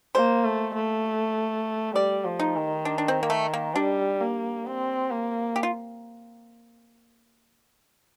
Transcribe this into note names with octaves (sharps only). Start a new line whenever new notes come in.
A#3 C5
A3
A3
G3 D5
F3
D#4
D#3
D4
D4
C4
A#3
A3
A#3
G3 D4
A#3
C4
A#3
G4
F4